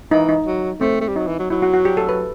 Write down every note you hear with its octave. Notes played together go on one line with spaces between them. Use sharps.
E3 D#4
D#4
F#3
A3 C4
A3
G3
F#3 D#4
E3
F#3
F#3 E4
F#4
F#4
G4
A4
B4